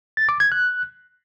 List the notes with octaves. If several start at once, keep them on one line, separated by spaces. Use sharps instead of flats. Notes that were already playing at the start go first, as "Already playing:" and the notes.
A6
D6
G#6
F#6